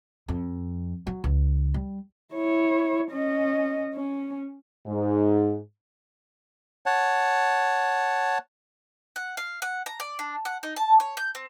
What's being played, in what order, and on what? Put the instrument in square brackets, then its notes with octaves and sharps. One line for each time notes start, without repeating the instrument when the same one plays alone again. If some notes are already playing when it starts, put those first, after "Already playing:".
[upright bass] F2
F#3
C#2
G3
[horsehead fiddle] E4 C#5
C#4 D#5
C#4
[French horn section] G#2
[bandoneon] C#5 F#5 A5
[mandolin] F#5
F5
F#5
A#5
D5
D4
F#5
D#4
A5
C#5
G6
C4